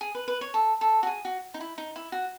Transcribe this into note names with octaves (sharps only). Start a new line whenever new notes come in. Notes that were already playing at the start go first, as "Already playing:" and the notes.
G#4
B4
B4
C#5
A4
A4
F#4
G#4
F#4
D#4
E4
D#4
E4
F#4